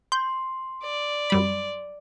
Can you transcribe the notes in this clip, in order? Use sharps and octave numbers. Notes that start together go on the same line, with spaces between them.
C6 G6
D5
F#2 G3 B5